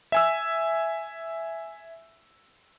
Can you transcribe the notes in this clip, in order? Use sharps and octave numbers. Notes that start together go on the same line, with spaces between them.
E5 G#5 E6